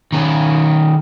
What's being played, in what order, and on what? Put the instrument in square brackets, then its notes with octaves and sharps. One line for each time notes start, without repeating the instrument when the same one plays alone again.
[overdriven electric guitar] D#3 C#4